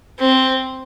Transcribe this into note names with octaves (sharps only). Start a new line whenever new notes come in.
C4